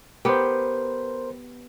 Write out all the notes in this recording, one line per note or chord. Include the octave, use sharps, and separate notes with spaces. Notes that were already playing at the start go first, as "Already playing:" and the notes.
B3 G4 A#4 C5